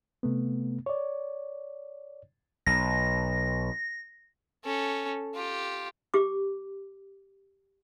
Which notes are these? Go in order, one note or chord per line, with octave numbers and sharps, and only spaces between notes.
C3 A3 B3
C#5 D5
B1 A#6
C#4 A4
F4 G4
G4 D6